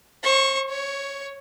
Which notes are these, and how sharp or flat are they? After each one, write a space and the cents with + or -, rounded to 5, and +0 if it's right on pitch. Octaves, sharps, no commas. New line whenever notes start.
C5 +40 C#6 -10
C#5 +0 C#6 +15